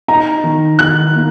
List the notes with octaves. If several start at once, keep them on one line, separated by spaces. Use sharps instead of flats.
D#4 A#5
D#3
D#3 F#6
A#3